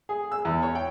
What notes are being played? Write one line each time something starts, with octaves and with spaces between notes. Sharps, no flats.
G#4
E6
E2
C#5
G5